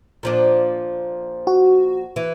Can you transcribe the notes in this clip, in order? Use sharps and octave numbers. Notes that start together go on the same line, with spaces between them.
A#2 F3 D4
F#4
E3